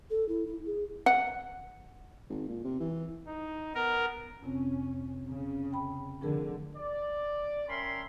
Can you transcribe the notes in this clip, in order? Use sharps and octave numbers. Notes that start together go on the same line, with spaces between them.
A4
E4
E4
G#4
F#5
G#1
A#2
C3
E3
D#4
B3 A#4
F2 C3 C4 C#4
C#3
G5 B5
F1 D3 F3 G#4 A#4
D5
C#4 A#4 E5 G5 B5 C6